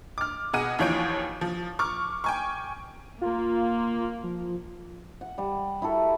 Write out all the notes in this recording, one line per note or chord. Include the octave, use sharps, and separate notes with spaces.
D6 F6
B2 G#4 F#5 D#7
D#2 E3 F3 C#5 G6 D7
F3
C#6 D6 F6
G5 G#5 C#6
A#3 F4
F3
F#5
G3 F#5
E4 F#4 A4 A#4